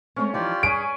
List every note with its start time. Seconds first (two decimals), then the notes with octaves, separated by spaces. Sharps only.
0.16 G#3 A3 C4 C#4
0.34 E3 F3 D#4 F4 G4 D5
0.63 G2 C#4 G#4 B4 G#5 D7